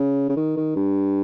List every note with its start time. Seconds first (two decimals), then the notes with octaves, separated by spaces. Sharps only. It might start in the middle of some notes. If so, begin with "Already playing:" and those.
Already playing: C#3
0.29 C#3
0.36 D#3
0.57 D#3
0.76 G2